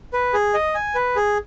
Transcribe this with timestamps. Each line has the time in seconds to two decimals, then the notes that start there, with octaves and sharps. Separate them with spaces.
0.13 B4
0.34 G#4
0.54 D#5
0.75 G#5
0.95 B4
1.16 G#4